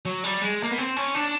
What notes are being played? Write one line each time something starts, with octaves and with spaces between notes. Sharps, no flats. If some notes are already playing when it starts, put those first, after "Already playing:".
F#3
G3
G#3
A#3
B3
C4
C#4
D4